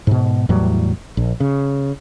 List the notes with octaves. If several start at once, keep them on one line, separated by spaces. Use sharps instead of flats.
G#2 B2
E2 A2 F#3 G3
A#1
C#3